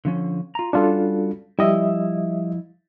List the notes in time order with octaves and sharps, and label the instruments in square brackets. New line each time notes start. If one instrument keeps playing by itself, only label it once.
[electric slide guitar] D3 F3 C#4
F4 A#5
[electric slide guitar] G3 C#4 F#4 [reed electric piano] D4 F4 A4
[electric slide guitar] F3 E4 [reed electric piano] G3 D#5 E5